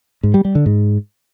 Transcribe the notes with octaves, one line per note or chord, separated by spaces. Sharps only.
G#2
G3
G3
D3
G#2